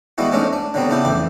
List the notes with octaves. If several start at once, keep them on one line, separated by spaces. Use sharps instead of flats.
E3 G3 G#3 B3 E4 F#4
G#2 G#3 A3 C#4 D4
D4
D3 F#3 G3 B3 C4
C#3 B3 D4 E4 G4
A1 F2 E3 D6